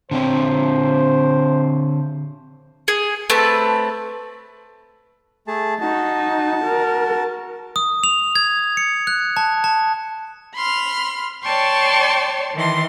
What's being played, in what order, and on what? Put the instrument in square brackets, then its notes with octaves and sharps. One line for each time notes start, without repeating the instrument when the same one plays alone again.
[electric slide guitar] D3 C4 C#5 [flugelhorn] C5
[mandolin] G#4
A3 C4 B4 A5
[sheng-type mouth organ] A3 G#4 A5
[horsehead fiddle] D#4 [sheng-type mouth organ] F#4 A5
[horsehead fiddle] A#4
[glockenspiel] D#6
F7
G#6
C#7
F#6
A5
A5
[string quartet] B5 C6 F6
C#5 D5 G5 A5 C6 C#6
D#3 E3 C6